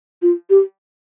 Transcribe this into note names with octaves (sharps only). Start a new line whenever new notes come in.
F4
G4